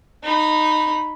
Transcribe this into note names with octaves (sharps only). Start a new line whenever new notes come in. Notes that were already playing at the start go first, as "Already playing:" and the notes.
D#4 B5